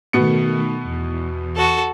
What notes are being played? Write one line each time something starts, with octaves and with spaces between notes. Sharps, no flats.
B2 D#3 A3 B3 C#7
E2
F#4 A4